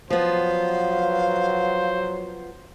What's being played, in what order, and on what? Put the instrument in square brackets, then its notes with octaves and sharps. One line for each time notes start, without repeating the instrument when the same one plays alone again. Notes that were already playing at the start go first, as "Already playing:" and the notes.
[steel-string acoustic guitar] F3 B3 [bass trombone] F#3 [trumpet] C5 [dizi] F5